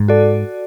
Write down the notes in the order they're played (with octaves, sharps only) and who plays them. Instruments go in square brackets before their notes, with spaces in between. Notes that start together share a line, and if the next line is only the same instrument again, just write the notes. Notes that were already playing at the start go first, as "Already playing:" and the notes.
Already playing: [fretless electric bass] G#2
[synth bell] F#4 A4 D5